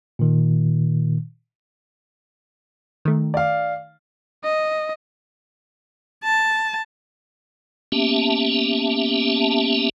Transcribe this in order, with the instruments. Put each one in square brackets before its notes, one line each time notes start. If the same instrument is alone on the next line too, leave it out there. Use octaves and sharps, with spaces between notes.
[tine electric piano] A#2 D#3
[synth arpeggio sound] D#3 A3
[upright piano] D5 F5
[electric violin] D#5
[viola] A5
[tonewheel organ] A#3 B3 C#4 G4 E5 A5